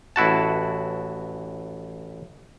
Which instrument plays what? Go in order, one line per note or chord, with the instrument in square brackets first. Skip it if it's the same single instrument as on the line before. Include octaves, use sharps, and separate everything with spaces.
[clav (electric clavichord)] A1 E4 F#4 A5